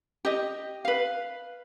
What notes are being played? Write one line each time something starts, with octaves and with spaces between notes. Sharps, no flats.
G4 D#5
B4 F5